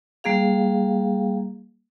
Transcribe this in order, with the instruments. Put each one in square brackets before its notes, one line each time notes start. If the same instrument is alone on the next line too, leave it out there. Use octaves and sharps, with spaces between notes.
[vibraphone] G3 A#3 G#4 F5